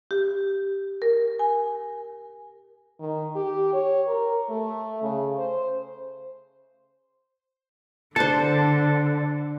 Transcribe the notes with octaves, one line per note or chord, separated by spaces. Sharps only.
G4
A#4
G#5
D#3
G4
C#5
A#4
A3
C#3
C5
D3 D4 A4 C5 A5